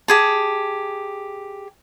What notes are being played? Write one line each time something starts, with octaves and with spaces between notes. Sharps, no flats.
G4 G#4 A5